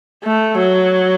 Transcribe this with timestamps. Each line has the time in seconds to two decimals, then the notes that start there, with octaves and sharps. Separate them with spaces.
0.24 A3
0.59 F#3